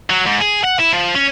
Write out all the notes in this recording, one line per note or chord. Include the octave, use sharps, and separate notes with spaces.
F#3
G#2
G#4
F#5
E4
F3
C#4